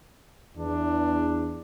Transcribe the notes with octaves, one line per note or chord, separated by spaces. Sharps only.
E2 D4